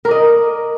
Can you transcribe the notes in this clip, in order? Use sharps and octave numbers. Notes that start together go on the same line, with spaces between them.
A#4 D5 D#5